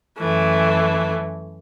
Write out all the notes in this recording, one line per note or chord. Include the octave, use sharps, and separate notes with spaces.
F#2 E3 A3